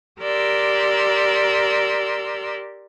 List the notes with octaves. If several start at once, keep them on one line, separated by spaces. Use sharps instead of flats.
G4 A#4 D5 C6 E6